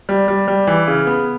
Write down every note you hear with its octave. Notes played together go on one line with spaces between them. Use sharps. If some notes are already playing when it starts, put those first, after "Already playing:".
G3
G3
G3
E3
C#3
B3